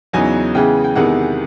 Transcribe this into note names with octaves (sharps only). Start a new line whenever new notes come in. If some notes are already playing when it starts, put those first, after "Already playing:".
E2 C#3 F#3 B3 D#4 G#5
C#3 E3 G#3 B3 G5
G5
E2 C3 D#3 G#3 B3 F#5